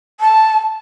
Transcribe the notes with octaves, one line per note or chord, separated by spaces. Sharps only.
A5